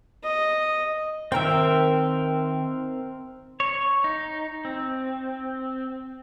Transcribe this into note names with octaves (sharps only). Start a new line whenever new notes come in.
D#5
D#3 C4 A#4 E5 G5
C#5
D#4
C4